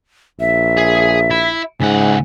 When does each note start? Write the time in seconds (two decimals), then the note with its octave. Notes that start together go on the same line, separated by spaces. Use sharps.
0.40 A#1 E5
0.77 G#4
1.31 E4
1.80 C#2 G#2 F#5 G#5